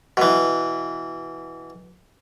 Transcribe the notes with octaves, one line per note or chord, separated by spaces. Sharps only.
B2 E3